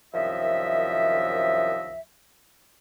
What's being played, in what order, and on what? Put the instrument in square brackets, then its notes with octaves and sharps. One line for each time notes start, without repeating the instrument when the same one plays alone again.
[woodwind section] C2 F#2 D#3 F3 D#5 E5